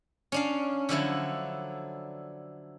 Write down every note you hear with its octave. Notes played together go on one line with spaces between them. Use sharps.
C#4 D4 F5
D3 F3 F#3 E4